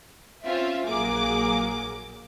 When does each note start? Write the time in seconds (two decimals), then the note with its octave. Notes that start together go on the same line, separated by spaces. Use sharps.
0.45 C4 C#4 F4 E5
0.87 A#1 F#3 A#3 G#4 D6